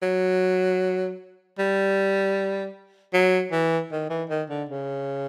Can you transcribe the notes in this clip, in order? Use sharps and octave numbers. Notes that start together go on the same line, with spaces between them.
F#3
G3
F#3
E3
D#3
E3
D#3
D3
C#3